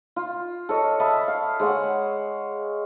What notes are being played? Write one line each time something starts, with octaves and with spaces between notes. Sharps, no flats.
F4
A4 C#5 D#5
E5 A5 B5 D#6
F5
G#3 C#5 F5 F#5